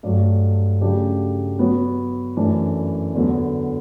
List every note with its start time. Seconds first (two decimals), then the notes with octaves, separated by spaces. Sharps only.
0.03 G2 F#3 A3
0.81 C#3 F#3 A3 D4 G4
1.59 F#3 B3 F#4 C#5
2.37 F#2 E3 A3 D4
3.14 E2 D3 F#3 B3